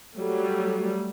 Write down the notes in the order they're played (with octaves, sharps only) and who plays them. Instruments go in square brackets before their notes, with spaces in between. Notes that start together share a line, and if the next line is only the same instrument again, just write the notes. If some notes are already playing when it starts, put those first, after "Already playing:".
[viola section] F#3 G3 A3